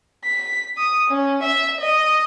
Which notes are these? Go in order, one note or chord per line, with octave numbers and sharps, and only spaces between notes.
B6
D#6
C#4
E5
D#5